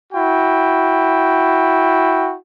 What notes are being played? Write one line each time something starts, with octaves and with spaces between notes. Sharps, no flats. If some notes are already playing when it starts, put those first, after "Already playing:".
E4 F#4 G5